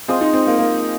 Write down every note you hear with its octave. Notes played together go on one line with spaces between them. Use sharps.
G#3 C4 F4 C5 D#5
D#4
C4
A#3
A#3